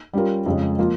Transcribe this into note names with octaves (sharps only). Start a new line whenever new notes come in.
G3 C#4 F4 A#4
F2 C#3 G#3
F3 A#3 F4